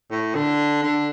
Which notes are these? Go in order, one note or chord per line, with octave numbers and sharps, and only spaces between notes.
A2
D3
D3